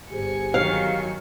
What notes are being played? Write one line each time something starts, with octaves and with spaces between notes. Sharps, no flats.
G1 G4 G#4 C5 G#5 C#7
D#3 F#3 F5